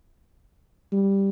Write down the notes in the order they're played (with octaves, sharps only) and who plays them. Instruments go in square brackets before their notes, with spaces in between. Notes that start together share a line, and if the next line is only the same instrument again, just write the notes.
[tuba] G3